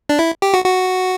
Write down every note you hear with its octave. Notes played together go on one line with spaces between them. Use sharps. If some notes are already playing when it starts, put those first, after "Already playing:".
D4
E4
G4
F#4
F#4